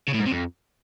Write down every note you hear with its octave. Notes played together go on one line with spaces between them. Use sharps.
C#3
A2
G#2
C3
F2